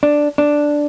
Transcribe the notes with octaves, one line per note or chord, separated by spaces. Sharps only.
D4
D4